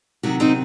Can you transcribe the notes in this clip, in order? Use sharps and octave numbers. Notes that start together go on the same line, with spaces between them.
C3 D#3 F#3 D#4 F#4
C4 D#4